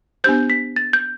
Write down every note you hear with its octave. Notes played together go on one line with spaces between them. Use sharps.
B3 D4 G4 C5 G6
B6
A6
G6